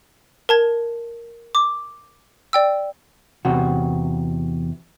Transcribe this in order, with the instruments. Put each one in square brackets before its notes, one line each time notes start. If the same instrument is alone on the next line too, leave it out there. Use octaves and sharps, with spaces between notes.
[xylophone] A#4 A5 G#6
D6
D5 G5 E6
[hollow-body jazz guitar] E2 C3 F#4